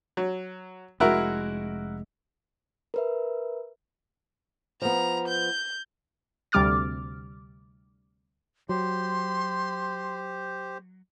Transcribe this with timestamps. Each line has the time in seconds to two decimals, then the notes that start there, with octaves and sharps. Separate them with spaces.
0.17 F#3
1.00 F1 G#3 E4 F#4 A#4
2.94 A#4 B4 E5
4.82 F3 B3 A#5
5.29 G6
6.52 D2 C3 G3 D6 F6 A6
8.69 F#3 G4 C5 C6